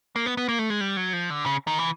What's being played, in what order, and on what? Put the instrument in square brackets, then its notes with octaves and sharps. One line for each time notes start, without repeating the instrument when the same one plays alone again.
[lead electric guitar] A#3
B3
B3
A#3
A3
G#3
G3
F#3
F3
D3
C#3
D#3
E3